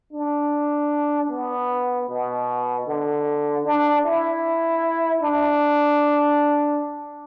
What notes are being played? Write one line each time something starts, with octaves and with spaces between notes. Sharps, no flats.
D4
B3
B2
D3
D4
E4
D4